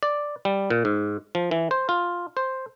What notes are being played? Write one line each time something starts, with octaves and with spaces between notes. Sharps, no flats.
D5
G3
A#2
G#2
F3
E3
C5
F4
C5